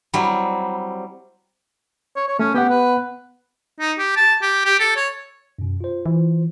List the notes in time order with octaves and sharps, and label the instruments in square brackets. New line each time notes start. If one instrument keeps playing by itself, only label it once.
[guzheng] F#3 G3 C4 E4
[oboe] C#5
C#5
[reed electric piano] A3 [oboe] C#4
[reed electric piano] B3 F#5 [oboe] G4
[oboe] B4
[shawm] D#4
G4
A5
G4
G4
A4
C#5
[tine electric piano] F#2 B2
F4 C5
[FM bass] E3